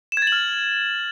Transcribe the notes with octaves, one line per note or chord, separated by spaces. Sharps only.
E7
G#6
A6
F#7
F6